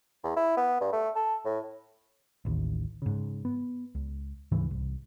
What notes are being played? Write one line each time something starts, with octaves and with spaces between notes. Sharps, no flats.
E2
E4
B3
G2
A3
A4
A2
A1 D#2
G#2 C#3
B3
C#2
D2 G#2 C#3 E3
C2